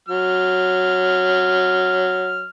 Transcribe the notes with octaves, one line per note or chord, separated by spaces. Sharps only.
F#3 F6